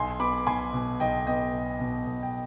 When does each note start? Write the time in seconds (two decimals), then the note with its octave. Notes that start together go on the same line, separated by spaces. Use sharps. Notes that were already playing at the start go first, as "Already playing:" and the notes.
Already playing: B1 G#5 C6
0.19 B3 B5 D6
0.47 B1 G#5 C6
0.73 B2
1.00 B1 D#5 G5
1.27 B3 D#5 G5
1.54 B1
1.80 B2
2.07 B1
2.23 G5